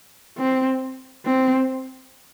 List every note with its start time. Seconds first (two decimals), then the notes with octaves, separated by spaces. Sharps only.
0.38 C4
1.26 C4